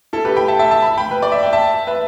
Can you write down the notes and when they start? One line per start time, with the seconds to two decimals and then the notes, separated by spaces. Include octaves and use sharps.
0.13 E4 A4
0.25 G4 B4
0.36 G5 B5
0.48 E5 A5
0.59 E5 A5
0.71 E5 A5
0.82 B5
0.98 G5 B5
1.11 B4
1.22 D5
1.32 E5
1.43 G5
1.53 E5 A5
1.87 B4 E5